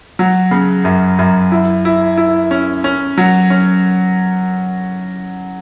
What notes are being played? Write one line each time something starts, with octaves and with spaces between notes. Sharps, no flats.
F#3
C#3
F#2
F#2
E4
E4
E4
C#4
C#4
F#3
C#4